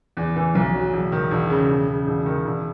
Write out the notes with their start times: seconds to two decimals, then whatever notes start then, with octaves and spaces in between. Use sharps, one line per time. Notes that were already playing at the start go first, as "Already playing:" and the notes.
0.17 E2
0.36 E3
0.55 B1
0.74 F#3
0.93 E1
1.12 D#3
1.31 E1
1.50 C#3
1.69 E1
1.88 C#3
2.07 E1
2.26 D#3
2.45 E1